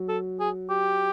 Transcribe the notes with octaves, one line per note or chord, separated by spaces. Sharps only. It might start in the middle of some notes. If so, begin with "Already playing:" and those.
Already playing: F#3
A4
G#4
G4